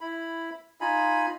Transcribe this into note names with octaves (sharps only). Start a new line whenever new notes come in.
E4 B5
D#4 F4 G#5 B5